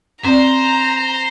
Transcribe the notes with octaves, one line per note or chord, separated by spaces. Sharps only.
C4 C5 D5 A#5